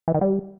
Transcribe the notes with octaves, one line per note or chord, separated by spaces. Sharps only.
E3
D#3
G3